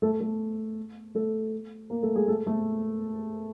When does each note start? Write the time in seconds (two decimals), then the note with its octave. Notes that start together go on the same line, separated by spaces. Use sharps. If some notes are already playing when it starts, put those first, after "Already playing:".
0.02 A3 A4
0.20 A3 A4
1.15 A3 A4
1.90 A#3 A#4
2.03 A3 A4
2.15 G#3 G#4
2.28 A3 A4
2.47 A3 A4